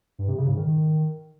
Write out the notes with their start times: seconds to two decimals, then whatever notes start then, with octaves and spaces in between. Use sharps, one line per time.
0.19 G2
0.28 C3
0.38 C#3
0.48 G#2
0.57 D#3